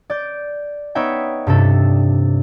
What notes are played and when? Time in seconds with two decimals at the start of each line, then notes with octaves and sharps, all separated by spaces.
0.10 D5 G6
0.95 B3 D#4 C#5 E5 G5
1.47 G2 C3 D4 A4